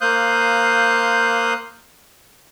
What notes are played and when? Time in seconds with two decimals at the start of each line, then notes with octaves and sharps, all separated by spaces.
0.01 A#3 C5 F5 D#6 F#6 G6